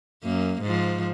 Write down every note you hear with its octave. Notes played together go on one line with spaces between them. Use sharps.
F#2 A#3
G#2 F3